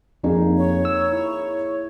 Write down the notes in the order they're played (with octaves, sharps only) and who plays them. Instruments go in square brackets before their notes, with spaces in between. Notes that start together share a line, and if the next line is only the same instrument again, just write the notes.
[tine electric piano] F2 [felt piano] A#3 D#4 G#4
[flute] C#5
[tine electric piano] E6
E4